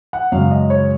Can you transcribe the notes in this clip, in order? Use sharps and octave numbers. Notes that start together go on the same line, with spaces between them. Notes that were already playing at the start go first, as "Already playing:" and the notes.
F#5
F#2 C#3 G#3 F5
D#5
C#5